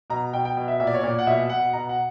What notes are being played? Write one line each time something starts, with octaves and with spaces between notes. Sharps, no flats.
B2 A#5
B2 G5
G5
B2
E5
A#2 E5
D5
C#5
A#2 D5
F#5
B2 E5
B2 F#5
B2 A#5
F#5